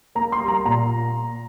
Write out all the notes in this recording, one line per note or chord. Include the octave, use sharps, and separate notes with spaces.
A#3 A#5
C6
G3
A#5
A#2 A#5